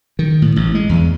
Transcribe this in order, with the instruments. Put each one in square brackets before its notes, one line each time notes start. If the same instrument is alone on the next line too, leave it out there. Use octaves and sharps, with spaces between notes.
[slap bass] D#3
A2
A1
G#3
E2